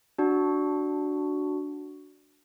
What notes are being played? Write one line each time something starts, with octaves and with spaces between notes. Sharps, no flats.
D4 F#4